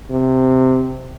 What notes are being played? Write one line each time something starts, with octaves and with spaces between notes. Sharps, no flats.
C3